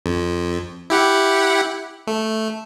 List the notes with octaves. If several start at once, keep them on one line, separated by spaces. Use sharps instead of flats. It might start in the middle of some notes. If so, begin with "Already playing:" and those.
F2
E4 G4 F#5
A3